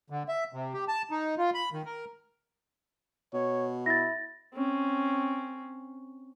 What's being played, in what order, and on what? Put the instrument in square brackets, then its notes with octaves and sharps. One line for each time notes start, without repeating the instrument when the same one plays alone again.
[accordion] D3
E5
C3
G4
A5
D#4
F4
B5
D#3
A#4
[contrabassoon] B2 [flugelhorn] C#5
[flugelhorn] E4 [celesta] A6 A#6
[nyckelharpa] C4 C#4